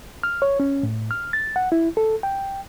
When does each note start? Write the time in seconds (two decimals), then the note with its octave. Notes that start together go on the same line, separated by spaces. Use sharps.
0.23 F6
0.42 C#5
0.60 C#4
0.83 A2
1.11 F6
1.33 A6
1.56 F#5
1.72 E4
1.97 A4
2.23 G5